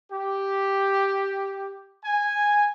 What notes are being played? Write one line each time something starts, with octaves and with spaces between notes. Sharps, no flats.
G4
G#5